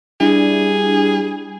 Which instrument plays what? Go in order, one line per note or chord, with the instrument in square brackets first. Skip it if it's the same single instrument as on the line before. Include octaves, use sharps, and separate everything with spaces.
[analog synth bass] G3 [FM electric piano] D4 E4 [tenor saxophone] G#4